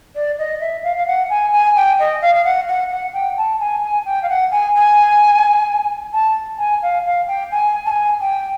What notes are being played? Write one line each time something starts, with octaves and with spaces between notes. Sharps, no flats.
D5
D#5
E5
F5
F5
F#5
G#5
G#5
G5
D#5
F5
F5
F#5
F#5
F#5
G5
A5
G#5
G#5
G5
F5
F#5
G#5
G#5
A5
G#5
F5
F5
G5
G#5
A5
G#5
G5